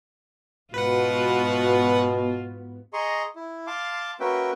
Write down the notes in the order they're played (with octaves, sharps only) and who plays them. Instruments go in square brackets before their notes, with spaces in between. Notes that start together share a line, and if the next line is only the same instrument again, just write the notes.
[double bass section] G#2 B3 [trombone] B2 [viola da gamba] F4 F#4 [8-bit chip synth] B4 F#5
[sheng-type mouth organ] G#4 D#5 A#5 C6 C#6
E4
F5 A5 C6 D6
A#3 C#4 F#4 B4 E5 G5